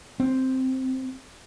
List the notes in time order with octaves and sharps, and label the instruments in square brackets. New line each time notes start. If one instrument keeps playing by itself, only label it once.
[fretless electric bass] C4